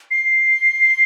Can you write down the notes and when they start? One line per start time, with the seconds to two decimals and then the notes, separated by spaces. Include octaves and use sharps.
0.11 C7